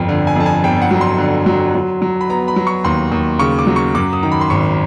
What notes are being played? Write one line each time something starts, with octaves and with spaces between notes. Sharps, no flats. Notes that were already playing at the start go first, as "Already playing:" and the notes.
Already playing: G1 F2 G5
D3
G#5
F2 A5
G#5
G1 G5
F#5
F#3
C6
D3
F#3
F#3
F#3
B5
B3 A#5
B5
F#3
C#6
D#2 C6
D#2
C#3 C#6
D6
F#3
C#6
F#2 D6
D#6
D#3 A#5
B5
C6
G#1 C#6